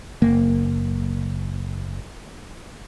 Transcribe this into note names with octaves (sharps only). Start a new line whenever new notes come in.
F#1 A#3